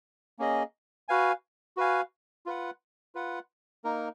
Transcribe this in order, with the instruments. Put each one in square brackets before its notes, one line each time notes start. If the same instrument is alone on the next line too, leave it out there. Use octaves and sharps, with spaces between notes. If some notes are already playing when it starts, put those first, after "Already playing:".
[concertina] A#3 C#4 G#4 D#5
F#4 B4 F5 G#5
F#4 B4 F5 G#5
F4 B4 F#5
F4 B4 F#5
A#3 D#4 A#4